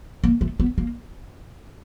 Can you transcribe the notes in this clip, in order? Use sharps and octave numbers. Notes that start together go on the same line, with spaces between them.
A#3
A3
B3
A#3